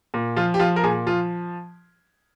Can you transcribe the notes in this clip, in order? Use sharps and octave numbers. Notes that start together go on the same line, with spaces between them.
A#2
F3 F4
G4
F3 F4
A#4
A#2 G#4
F3 F4